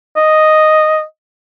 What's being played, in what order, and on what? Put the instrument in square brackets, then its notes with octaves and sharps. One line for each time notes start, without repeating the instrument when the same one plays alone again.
[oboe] D#5